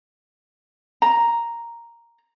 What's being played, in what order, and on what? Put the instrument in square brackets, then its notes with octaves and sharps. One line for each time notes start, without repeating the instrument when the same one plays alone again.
[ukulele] A#5